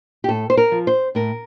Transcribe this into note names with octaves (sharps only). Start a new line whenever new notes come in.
G4
A2 A4
C5
A#4
F3
C5
A2 A#4